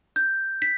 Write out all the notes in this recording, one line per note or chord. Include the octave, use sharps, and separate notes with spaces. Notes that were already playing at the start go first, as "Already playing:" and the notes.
G6
B6